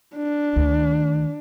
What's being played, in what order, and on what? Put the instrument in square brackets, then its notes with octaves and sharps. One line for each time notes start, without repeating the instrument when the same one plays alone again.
[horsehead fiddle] D4
[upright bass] D2 D#3